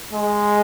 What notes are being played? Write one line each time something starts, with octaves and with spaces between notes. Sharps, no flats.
G#3